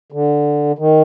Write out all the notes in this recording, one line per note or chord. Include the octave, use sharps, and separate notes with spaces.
D3
D#3